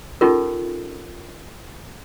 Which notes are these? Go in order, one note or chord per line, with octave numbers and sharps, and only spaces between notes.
C#4 D#4 F4 G4 A4 A#4